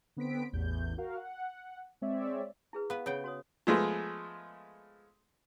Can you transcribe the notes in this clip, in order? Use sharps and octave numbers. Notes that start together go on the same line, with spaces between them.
D3 B3 C4 B6 D7
A1 E2 G6
F#4 A#4 F5
F#5
G#3 C4 C#5 D5 E5
E4 G#4 B4
B3 B4 F5
C#3 B3 C#5 F#5 G5
F#4 C#5 D#6
F3 G#3 A3 B3